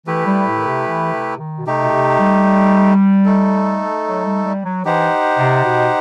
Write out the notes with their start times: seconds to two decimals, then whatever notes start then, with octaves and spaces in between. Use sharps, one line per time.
0.07 E3 A3 E4 G4 B4
0.26 G3
0.47 A2
0.57 D#3
0.67 C3
0.87 E3
1.13 C3
1.39 D#3
1.58 B2
1.66 C3 A3 D#4 G4
1.83 B2
1.93 C3
2.19 G3
3.25 A3 D#4 A4
4.05 F#3
4.25 G3
4.45 G3
4.65 F#3
4.85 E3 D#4 G4 C5 F#5
5.38 C3
5.64 B2